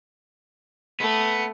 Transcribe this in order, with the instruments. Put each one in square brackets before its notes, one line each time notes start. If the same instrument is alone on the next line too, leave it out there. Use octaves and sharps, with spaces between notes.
[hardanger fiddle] A3 [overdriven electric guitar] B3